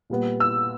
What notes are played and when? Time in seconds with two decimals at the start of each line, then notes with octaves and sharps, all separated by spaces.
0.10 A#2 G3 B3
0.40 E6